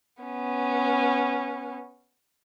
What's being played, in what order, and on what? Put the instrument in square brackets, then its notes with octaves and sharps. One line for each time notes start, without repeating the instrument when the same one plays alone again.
[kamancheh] B3 C#4